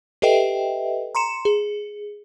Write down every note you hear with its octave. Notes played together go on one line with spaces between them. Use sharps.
G4 A4 B4 D#5 E5 G5
A#5 C6 C#7 E7
G#4